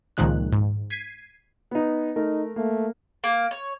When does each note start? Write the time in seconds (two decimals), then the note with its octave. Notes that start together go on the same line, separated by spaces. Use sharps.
0.17 C#2 A#2 D#3 F3 G#3 F#6
0.53 G#2
0.90 G#6 B6 C7 D#7
1.71 B3 D#4
2.16 A3 D#4 A#4
2.56 A3 A#3
3.24 A#3
3.51 C#5